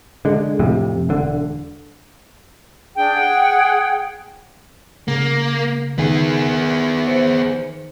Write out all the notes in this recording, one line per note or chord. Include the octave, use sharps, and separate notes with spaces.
D3 G#3
F2 A2 C3
E1 D3
D4 G#4 G5
G#4 F#5 G#6
C#3 A#3
D#3 B3 G#4
C5 C#7